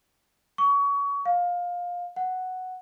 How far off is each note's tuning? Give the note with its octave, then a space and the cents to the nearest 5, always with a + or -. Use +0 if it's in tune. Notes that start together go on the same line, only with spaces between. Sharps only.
C#6 +30
F5 +20
F#5 +0